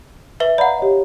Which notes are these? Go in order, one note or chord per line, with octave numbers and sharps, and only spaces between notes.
B4 E5 G7
D5 F5 F#5 A#5 B5
G4 C#5 D#5